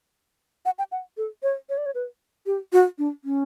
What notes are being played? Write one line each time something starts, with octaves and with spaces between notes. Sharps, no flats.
F#5
G5
F#5
A4
C#5
C#5
D5
C#5
B4
G4
F#4
D4
C#4